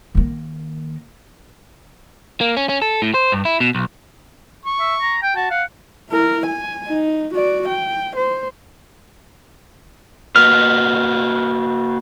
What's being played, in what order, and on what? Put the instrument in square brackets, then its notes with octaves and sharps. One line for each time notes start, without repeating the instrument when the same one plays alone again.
[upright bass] D#3 A#3
[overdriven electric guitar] A#3
C#4
C#4
A4
A2
C5
G2
E4
B2
B1
[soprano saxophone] C#6
[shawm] E5
A#5
G5
[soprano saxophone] F#4 [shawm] A5
[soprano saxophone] F5 [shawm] F#5
[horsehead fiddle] E4 A#4
G#5
D#4
F#4 D5
G5
C5
[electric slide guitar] A#3 F#4 B4 [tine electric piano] F6